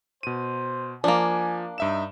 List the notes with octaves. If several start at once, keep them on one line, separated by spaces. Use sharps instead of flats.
B2 C5 D#7
F3 A#3 D4 G#5
G2 D#4 E5 E7